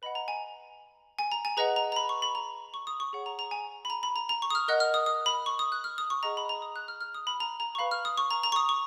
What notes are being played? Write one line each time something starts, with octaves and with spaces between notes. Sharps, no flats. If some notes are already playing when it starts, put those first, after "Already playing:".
B4 D#5 F#5 B5
A#5
G#5
G#5
A#5
G#5
G#4 B4 D#5 F#5 A#5
A#5
A#5
B5
C#6
B5
A#5
C#6
D#6
C#6
G#4 C#5 F#5
A#5
A#5
G#5
B5
A#5
B5
A#5
A#5
C#6
D#6
F6
A#4 D#5 F#5 F#6
F6
D#6
D#6
B5
C#6
D#6
F#6
F6
D#6
C#6
G#4 D#5 F#5 A#5
B5
A#5
D#6
F#6
F6
F6
D#6
B5
A#5
A#5
C#6
B4 F5 B5
F6
D#6
C#6
A#5
A#5
C#6
D#6
C#6